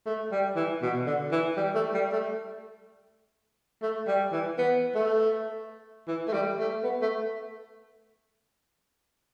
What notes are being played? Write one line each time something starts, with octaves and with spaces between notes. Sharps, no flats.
A3
G3
E3
B2
D3
E3
G3
A3
G3
A3
A3
G3
E3
B3
A3
E3
A3
G3
A3
B3
A3